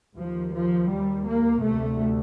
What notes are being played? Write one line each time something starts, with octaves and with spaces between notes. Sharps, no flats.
D#2 F3
F3
G3
A#3
D2 C3 A3